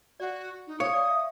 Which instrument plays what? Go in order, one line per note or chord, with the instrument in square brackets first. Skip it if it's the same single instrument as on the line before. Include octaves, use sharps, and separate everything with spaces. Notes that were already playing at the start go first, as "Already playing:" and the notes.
[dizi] F#4 [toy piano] D5 F#5
[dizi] D#4
[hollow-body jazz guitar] C#5 [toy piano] F5 [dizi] D#6
[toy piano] D5 F5 G5
E5